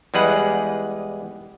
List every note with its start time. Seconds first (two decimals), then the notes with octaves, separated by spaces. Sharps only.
0.14 E2 G3 G#3 G#4 B4 F#5